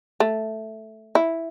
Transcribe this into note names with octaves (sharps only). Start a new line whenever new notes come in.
A3
E4